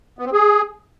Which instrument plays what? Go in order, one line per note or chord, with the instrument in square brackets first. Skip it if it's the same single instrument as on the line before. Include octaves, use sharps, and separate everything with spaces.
[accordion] B3
C4
G#4